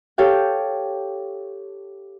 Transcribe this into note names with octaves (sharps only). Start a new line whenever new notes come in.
G4 A4 C#5 F5 G5